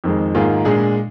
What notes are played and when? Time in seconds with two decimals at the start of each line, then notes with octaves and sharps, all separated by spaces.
0.04 F2 D#3 G#3
0.35 G#2 D#3 A#3 F4 G#4
0.65 A#2 G#3 D4 G#4